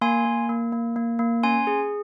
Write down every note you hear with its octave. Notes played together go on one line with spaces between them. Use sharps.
A#3 G#5 C6
A#3
A#3
A#3
A#3
A#3
C#4 G#5 C6
G#4